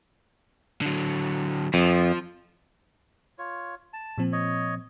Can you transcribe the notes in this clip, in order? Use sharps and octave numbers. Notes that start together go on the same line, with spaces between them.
D3 F#3
F2 F3
F4 C#5
A5
A#2 F3 C4
C#5 D#5